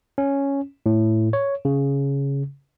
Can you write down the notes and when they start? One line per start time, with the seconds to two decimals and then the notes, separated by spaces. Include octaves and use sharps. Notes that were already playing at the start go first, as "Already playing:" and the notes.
0.18 C#4
0.86 A2
1.33 C#5
1.65 C#3